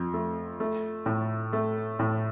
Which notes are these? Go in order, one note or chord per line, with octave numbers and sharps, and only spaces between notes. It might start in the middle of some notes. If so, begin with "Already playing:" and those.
Already playing: F2
A3
A3
A2
A3
A2